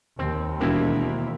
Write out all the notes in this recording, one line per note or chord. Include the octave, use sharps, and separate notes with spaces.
D#2 C4
E1 B2 A#3 C4 E4